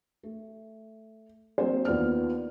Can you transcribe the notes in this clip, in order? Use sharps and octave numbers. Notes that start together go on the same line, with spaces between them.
A3
F#3 A#3 C4 D4 C5
D#2 F3 B3 D5 F6